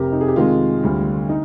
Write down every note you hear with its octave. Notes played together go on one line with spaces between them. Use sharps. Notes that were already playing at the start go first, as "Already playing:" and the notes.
Already playing: F1 F2 C3 G4 A#4
D#4
G#4
G4
F2 C3 D#3 G#3 F4
D2 D3 G3
D#4